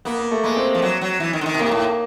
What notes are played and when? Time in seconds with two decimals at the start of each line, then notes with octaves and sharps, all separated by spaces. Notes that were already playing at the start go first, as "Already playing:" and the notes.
0.05 A#3 B3
0.18 A#3
0.31 A3
0.43 G#3 A#3
0.56 C4
0.75 F3
0.82 F#3
1.01 F#3
1.20 E3
1.33 D#3
1.41 D3
1.46 D#3
1.54 B2
1.59 C3 A#3
1.71 A2